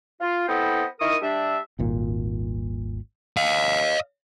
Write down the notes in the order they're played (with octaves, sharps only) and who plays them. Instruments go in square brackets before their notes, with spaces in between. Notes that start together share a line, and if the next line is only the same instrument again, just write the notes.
[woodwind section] F4
B3 C4 E4 A4 D#5 G5
D#3 E4 A#4 C#6 D#6
G3 D4 E5
[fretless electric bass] D#1 G#1 A#2
[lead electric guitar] D#5 F5